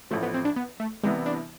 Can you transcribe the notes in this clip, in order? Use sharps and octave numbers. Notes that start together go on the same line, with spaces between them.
A1 A2 F3 A3
B3
C4
D4
B3
A3
C2 C3 E3 G#3 B3 E4
D4